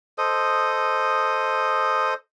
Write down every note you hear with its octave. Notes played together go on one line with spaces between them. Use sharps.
A4 C5 D#5 D#6